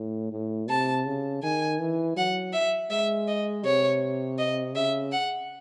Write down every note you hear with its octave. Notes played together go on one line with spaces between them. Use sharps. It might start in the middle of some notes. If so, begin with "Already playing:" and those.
Already playing: A2
A2
C3 A5
C#3
D#3 G#5
E3
F#3 F#5
E5
G#3 E5
D#5
C3 C#5
D#5
C#3 E5
F#5